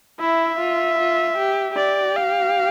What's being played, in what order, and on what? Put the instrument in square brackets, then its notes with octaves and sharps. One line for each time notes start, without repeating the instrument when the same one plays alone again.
[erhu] E4 [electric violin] E5
[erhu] F4
F4
G4
[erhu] G4 [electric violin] D5
[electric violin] F5